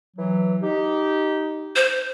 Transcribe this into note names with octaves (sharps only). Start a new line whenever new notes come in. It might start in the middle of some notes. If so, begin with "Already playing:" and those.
E3 F#3
D#4 G4
C5